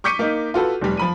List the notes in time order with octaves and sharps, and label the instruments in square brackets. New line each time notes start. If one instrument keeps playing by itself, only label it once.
[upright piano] C#6 D6 G6 B6 C#7 D#7
A#3 D#4
F4 F#4 A4 B4
F1 G3
F3 B5 D#7